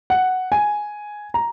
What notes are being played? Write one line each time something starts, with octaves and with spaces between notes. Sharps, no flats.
F#5
G#5
A#5